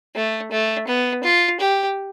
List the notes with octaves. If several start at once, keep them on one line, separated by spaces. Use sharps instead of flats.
A3
A3
B3
F4
G4